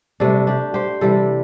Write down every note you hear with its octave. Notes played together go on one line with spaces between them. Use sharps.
C3 G3 A3 D4
D4 G4
G4 C5
C3 E3 G3 A4 D5